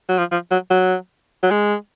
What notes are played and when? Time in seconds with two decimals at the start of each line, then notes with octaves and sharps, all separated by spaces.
0.09 F#3
0.19 F3
0.32 F3
0.51 F#3
0.71 F#3
1.43 F#3
1.51 G#3